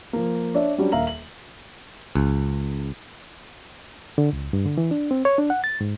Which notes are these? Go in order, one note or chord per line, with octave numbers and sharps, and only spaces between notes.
F3 A#3
D4 C#5 D5 E5
F#3 G3 C#4 D4
D#1 A#3 E5 F5 A#5 F#7
F#7
C#2
D3
C#2
G2
D3
E3
D4
C4
C#5
D4
F#5
A6
G#2